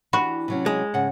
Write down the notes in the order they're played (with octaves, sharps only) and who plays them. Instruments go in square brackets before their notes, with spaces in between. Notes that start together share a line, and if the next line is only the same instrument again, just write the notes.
[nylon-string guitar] E3 D4 G4 [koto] F#4 [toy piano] B5
[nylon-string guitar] C3 F#3 C#4
[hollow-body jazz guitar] G#3
[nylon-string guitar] G#2 C#3 F#5